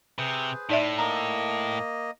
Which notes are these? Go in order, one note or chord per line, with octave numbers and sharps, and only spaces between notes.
C3 G#4 B4 C5
A2 D#4 D5 E5
A#3 D#5 A#5